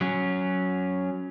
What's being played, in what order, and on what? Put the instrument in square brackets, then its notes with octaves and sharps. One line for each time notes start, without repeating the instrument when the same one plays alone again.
[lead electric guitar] F#3 C#4